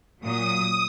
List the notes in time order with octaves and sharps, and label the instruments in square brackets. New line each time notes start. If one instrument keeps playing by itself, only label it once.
[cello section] A#2 F#3 [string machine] D#6